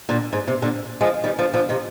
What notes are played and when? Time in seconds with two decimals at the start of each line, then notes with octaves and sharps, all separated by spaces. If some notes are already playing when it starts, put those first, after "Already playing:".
0.09 A#2 D3
0.33 G#2
0.48 C3
0.62 A#2 D3
1.01 F3 G#3
1.24 D#3 G3
1.39 D3 F3
1.54 D3 F3
1.69 C3 D#3